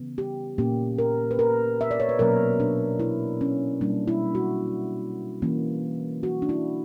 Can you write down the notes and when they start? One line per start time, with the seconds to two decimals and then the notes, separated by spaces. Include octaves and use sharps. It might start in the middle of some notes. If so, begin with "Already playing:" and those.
Already playing: C#3 E3 B3
0.18 G4
0.58 A#2 A#3 C#4 G4
0.98 A#4
1.31 B4
1.39 A#4
1.81 E5
1.91 D5
2.00 C#5
2.09 B4
2.19 B2 F#3 A#3 C#4 A#4
2.60 D4
3.00 E4
3.41 C#4
3.81 B2 G3 A#3 C#4 D4
4.08 E4
4.35 F#4
5.42 E3 A#3 C#4
6.23 F#4
6.42 D4
6.49 E4